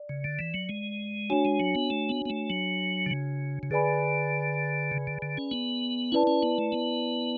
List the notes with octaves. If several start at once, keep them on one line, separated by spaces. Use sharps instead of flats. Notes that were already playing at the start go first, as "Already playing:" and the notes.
Already playing: D5
C#3
D3
E3
F#3
G#3
A3 D4 F#4 C#5 G#5
G#3
F#3
B3
A3
B3
B3
A3
F#3
D3
C#3
C#3
D3 G#4 B4 D5 G#5 B5
C#3
D3
D3
C#4
B3
C#4 E4 B4 D5 A5
C#4
B3
A3
B3